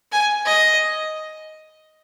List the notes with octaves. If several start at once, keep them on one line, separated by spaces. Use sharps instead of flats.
G#5
D#5